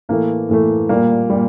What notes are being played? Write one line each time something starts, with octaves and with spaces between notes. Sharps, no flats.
A2 E3 A3 A#3
A2 E3 A3
A#2 G3 A#3
A#2 G3